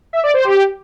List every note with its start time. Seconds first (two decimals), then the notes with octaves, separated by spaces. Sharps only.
0.13 E5
0.24 D5
0.34 C5
0.45 G4